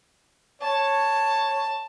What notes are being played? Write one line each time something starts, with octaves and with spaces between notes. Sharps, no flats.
C#5 A5